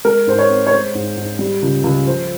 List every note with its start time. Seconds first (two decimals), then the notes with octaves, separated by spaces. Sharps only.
0.05 G#3 A#4
0.27 G#2 C5
0.39 C#5
0.49 C4
0.67 C#5
0.71 G#3 C5
0.95 G#2
1.17 G#2
1.39 G3
1.62 C#2
1.84 C#2
2.07 F3 C5